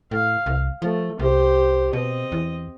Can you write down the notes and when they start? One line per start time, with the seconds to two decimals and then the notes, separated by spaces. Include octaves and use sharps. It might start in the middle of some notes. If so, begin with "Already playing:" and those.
0.11 A2 F5
0.46 C2
0.82 F3 A3
1.19 C2 G4 C5
1.93 B2 C4 D#5
2.32 E2